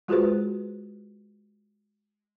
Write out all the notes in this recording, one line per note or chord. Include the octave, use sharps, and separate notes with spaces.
G#3 F4 F#4 G#4 B4 C5